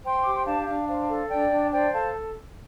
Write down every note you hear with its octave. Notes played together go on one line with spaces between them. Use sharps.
C5 G5 C6
G4 D6
C6
D4 F5 A5
D4 F5
C5 F5
A4
D4 D5 G5
D4
C5 D5 G5
A4 F5 A5